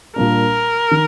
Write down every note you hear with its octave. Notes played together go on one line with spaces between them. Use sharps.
A#2 G3 A#3 D4 A#4
D#3